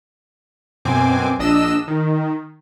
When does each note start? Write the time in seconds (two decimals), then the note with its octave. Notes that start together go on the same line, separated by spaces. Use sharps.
0.85 F#2 B2 C4 G#5 D6
1.39 A#1 D4 D#5 E6 E7
1.88 D#3